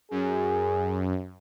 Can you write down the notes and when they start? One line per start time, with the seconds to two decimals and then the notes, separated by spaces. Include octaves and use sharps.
0.11 F#2 G#4